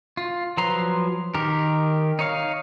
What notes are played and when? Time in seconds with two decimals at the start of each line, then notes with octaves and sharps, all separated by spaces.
0.17 F4
0.57 F3 F#3 B4 A#5 C6
1.35 D#3 G4 A#4
2.19 D#4 C#5 F5